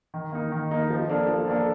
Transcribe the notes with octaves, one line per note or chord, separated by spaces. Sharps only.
D#3
A#3 D#4
D#3
A#3 D#4
F3
A#3 D4 A4
F3
A#3 D4 A4